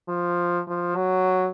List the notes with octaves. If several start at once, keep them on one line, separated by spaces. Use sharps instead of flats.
F3
F3
F#3